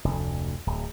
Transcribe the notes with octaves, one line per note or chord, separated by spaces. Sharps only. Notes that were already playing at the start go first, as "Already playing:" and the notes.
F1 D2
D1